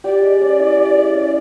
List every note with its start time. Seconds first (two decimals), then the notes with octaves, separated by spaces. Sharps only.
0.04 G4 D5
0.23 G#3
0.41 C#4
0.59 E4
0.78 G4
0.96 G#3
1.14 C#4